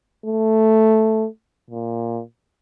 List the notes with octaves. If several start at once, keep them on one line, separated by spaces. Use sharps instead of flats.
A3
A#2